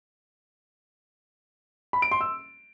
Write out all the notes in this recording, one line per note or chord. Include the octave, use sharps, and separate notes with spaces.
B5
D7
C6
E6